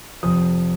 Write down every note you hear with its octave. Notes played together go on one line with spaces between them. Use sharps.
F1 F2 F3 D#6